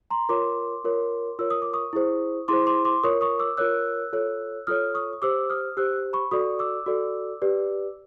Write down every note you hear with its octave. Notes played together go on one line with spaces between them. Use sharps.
A#5 C6
F4 A#4 C#5 C6 D6
F4 A#4 C#5
F4 A#4 C#5 E6
D#6
D6
C#6 D#6
E4 G#4 C5
E4 G#4 C5 C6 D6
C6 D6
C6 D6
F4 A#4 C#5 C#6 D#6
C#6 D#6
D6 E6
F4 A#4 C#5 E6 F#6
F4 A4 C#5
F4 A4 C#5 D#6 F6
C#6 D#6
D#6
G4 C5 D6 E6
D#6 F6
G4 C5 E6 F#6
B5 C#6
F#4 A4 D5 C#6 D#6
D6 E6
F#4 A4 D5
G4 B4 D5